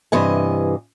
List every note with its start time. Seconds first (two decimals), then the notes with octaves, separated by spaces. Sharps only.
0.12 G2 C3 E3 D#5 G#5